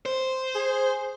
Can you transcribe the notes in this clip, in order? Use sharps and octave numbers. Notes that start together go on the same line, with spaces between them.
C5
G#4